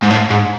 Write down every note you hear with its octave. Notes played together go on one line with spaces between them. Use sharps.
G#2
A2
G#2